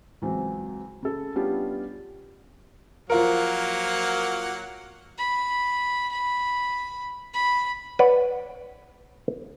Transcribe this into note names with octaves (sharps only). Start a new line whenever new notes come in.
C#2 E3 F#3 C4
C#3 A4
G3 B3 C#4 D4 F4 G4
F3 F#3 A#3 F4 A#4 F#5
B5
B5
B5
B4 C#5 D5 F#5